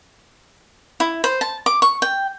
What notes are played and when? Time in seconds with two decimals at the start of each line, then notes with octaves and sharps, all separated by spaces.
1.00 E4
1.24 C5
1.41 A5
1.66 D6
1.82 C#6
2.02 G5